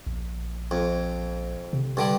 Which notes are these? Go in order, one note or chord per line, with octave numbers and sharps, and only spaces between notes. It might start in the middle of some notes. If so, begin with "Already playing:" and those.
A#1
F2
C3
G2 D3 G3